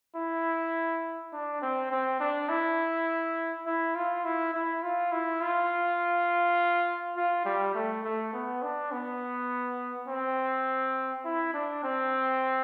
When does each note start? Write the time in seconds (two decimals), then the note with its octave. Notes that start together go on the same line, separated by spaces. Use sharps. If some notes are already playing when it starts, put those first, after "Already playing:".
0.15 E4
1.33 D4
1.61 C4
1.91 C4
2.20 D4
2.49 E4
3.66 E4
3.95 F4
4.24 E4
4.53 E4
4.82 F4
5.12 E4
5.41 F4
7.16 F4
7.45 G3
7.74 A3
8.04 A3
8.33 B3
8.62 D4
8.92 B3
10.08 C4
11.25 E4
11.54 D4
11.83 C4